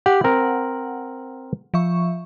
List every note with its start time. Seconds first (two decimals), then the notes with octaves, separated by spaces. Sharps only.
0.06 G4 F#5
0.24 C4 A#4
1.74 F3 E5 C#6